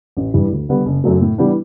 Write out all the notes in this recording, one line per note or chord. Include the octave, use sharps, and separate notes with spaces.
A1
G2 E3 G3
D2
D3 G3 B3
F#1
F#2 C#3 F#3 A3
A2
E3 G3 B3 D4